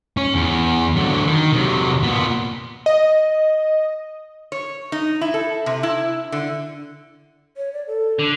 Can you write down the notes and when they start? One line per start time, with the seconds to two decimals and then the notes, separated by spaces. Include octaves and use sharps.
0.17 C#4
0.35 E2
0.96 D3 F#3
1.27 D#3
1.53 C3 F#3
2.03 A#2 B3
2.86 D#5
4.52 C#5
4.92 D#4
5.21 E4
5.34 A4
5.66 C3
5.83 E4
6.32 D3
7.57 C#5
7.73 D5
7.87 A4
8.19 D3